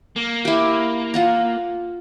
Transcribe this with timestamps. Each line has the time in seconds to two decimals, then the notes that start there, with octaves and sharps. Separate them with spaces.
0.16 A#3
0.45 E4 G4
1.14 F4 F#5 A#5